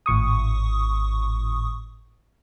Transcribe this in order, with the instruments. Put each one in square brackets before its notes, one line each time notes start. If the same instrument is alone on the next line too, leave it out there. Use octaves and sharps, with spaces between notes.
[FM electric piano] G#1 A2 C#6 D#6